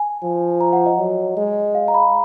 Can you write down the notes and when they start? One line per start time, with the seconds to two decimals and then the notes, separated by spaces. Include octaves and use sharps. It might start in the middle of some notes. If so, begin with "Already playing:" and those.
Already playing: G#5
0.23 F3
0.61 A#5
0.73 F#5
0.86 D#5
0.99 F#3
1.37 G#3
1.75 F5
1.88 A#5
1.94 B5